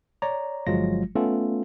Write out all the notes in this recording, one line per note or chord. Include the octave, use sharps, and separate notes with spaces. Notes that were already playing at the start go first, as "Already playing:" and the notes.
C#5 D5 A#5
G1 F3 F#3 G#3 F4 A#6
A3 B3 C#4 F4 A4